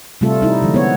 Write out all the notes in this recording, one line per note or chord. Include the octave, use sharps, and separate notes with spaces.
C3 G3 A3 F4 A4
G3 D#4 E4
D3 F3 G#3
B3 C#5